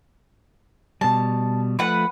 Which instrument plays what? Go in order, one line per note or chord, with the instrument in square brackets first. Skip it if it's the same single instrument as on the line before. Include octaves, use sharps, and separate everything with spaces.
[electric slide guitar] B2 G3 [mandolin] A5
[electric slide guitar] F3 A3 [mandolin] B4 F#5